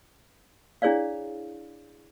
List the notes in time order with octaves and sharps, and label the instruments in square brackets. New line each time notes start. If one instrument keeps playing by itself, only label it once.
[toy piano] D4 E4 G#4 C#5 D5 F5